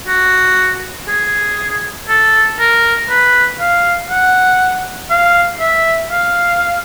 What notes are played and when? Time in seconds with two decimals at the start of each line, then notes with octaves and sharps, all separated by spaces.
0.08 F#4
1.08 G#4
2.08 A4
2.59 A#4
3.10 B4
3.60 F5
4.10 F#5
5.10 F5
5.60 E5
6.11 F5